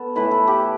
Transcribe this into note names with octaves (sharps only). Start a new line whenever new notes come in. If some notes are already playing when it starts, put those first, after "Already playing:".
Already playing: B3 A4
A2 E3 A3 B4
A4
G4